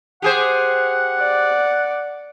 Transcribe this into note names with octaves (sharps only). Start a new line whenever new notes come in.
G4 G#4 C5 F#5
D5